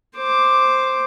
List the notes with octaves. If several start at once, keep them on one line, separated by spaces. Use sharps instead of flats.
C5 D6